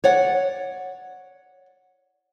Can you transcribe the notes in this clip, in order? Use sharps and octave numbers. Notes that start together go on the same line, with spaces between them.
C#5 D5 F#5